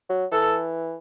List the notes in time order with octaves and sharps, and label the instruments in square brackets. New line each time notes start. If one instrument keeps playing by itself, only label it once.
[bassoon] F#3
[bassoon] E3 [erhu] A4